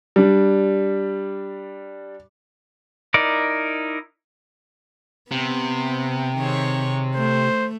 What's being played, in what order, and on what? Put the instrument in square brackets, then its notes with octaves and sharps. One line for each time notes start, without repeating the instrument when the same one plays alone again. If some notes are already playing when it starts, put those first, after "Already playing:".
[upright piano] G3 D4
[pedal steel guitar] D#4 E4 A#4 D5
[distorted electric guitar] C3 [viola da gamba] B3
[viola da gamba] D#3 G#4 C#5
[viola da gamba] A3 [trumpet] C5